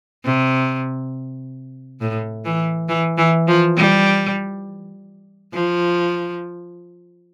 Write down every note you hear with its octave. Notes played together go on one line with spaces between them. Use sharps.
C3
A2
E3
E3
E3
F3
G3
F3